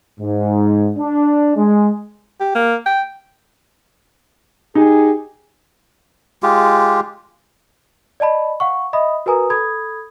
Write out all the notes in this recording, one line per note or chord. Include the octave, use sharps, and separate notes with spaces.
G#2
D4
G#3
G4
A#3
G5
D#4 G4 G#4
G#3 F4 G4
D5 D#5 A5 B5
F5 F#5 C#6
D#5 E5 B5 D#6
F#4 A#4 B4 G#5 A#5 D#6
A4 B5 D#6 G#6